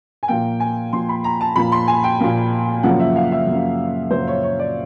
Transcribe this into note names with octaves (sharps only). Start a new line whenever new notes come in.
G#5
A#2 F3 A#3 G5
G#5
A#2 F3 A#3 C6
B5
A#5
A5
A#2 F3 A#3 B5
C6
G#5
G5
A#2 F3 A#3
F#2 C#3 F3 A#3 F#5
E5
F5
E5
F#2 C#3 F3 A#3
F#2 C#3 F3 A#3 C5
C#5
C#5
D5